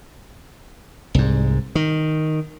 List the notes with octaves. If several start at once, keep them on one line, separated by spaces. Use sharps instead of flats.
C2 G#2
D#3